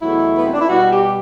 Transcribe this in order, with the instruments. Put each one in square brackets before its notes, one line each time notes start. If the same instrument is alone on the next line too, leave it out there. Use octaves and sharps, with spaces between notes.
[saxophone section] E2 B2 F#3 A3 E4
B3
C4
D4
E4
B2 G3 F#4
G4